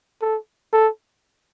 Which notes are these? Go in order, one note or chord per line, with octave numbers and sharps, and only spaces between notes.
A4
A4